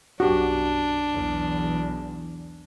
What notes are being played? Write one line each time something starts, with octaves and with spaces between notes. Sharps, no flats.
B1 F#2 D4 F#4 G4
B1 E2